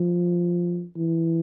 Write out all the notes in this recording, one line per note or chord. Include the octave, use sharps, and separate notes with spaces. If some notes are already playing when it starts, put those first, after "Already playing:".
Already playing: F3
E3